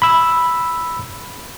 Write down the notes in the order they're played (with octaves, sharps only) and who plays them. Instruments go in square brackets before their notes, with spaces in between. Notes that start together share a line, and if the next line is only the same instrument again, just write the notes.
[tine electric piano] B5 E6